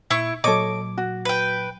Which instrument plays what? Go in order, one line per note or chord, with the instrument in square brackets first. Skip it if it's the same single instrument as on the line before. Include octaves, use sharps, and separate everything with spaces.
[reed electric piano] A#2 [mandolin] E4 C#6
[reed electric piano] A#2 F#3 [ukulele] A4 C#5 D#5 [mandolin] D6
[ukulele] F#4
[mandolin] B4 G5